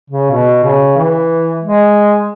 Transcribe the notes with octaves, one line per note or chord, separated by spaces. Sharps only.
C#3
B2
C#3
E3
G#3